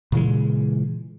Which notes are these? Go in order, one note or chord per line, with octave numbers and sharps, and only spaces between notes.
A#2 C#3 E3 G#3